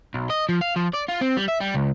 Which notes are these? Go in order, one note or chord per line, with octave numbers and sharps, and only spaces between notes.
B1
D#5
F3
F5
F3
D5
F4
C4
G3
E5
G3
C#2